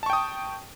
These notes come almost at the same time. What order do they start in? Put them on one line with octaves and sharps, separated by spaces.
A5 C#6 G5 D#6